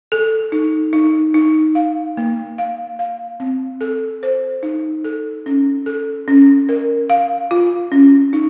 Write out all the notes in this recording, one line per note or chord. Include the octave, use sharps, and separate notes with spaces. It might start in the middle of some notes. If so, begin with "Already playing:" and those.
A4
D#4
D#4
D#4
F5
A#3
F5
F5
C4
A4
C5
D#4
A4
C#4
A4
C#4
A#4
F5
F4
C#4
D#4